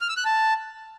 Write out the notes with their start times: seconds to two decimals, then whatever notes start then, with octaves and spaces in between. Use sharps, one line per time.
0.01 F6
0.09 E6
0.17 F#6
0.25 A5